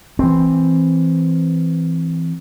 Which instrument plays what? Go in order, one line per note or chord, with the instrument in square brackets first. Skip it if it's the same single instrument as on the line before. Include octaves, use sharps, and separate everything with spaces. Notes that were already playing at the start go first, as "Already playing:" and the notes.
[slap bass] E3 C4